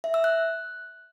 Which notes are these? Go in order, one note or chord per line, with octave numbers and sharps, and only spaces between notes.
E5
E6
F#6